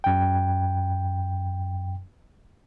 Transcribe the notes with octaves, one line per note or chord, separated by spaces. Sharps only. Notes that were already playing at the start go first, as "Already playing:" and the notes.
F#2 G5